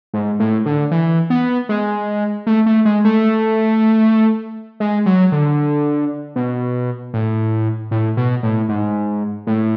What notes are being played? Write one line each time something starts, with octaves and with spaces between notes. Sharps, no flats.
G#2
A2
D3
E3
B3
G#3
A3
A3
G#3
A3
G#3
F#3
D3
B2
A2
A2
B2
A2
G#2
A2